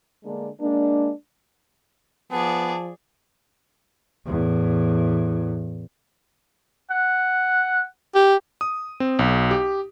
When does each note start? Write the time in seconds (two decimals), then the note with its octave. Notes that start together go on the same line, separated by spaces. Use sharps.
0.25 D3 G#3 A#3 D4
0.60 G#3 A#3 D4
2.32 F3 B3 G#4 D5 A5
4.26 E2 A2
6.90 F#5
8.15 G4
8.61 D#6
9.00 C4
9.19 B1
9.51 G4